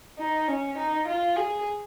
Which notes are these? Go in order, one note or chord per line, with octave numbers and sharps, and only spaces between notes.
D#4
C#4
D#4
F4
G#4